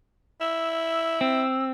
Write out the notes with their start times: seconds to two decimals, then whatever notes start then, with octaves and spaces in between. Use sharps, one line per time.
0.41 E4 E6
1.21 C4